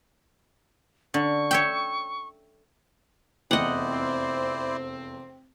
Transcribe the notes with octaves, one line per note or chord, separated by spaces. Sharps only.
D3 C#6
C#5 E5 G5
F1 E2 E4 C5 D5 D#5 F#5 G5
C4